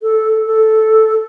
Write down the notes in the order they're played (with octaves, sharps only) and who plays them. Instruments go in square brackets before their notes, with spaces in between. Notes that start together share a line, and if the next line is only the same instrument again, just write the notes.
[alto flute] A4
A4